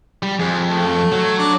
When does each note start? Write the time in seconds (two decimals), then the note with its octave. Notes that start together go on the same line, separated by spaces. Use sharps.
0.23 G3
0.39 F2 G#3
0.67 A3
1.12 F#3
1.38 D4